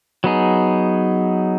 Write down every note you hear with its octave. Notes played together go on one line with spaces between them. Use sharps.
F#3 B3 D#4 G#4